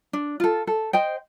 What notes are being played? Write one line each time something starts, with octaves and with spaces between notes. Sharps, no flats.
D4
F4 A4
A4
C5 D#5 G5